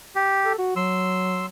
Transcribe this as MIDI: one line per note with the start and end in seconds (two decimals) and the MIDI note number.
0.16 0.53 67
0.45 0.56 69
0.59 0.74 66
0.76 1.45 54
0.76 1.46 84
0.76 1.46 88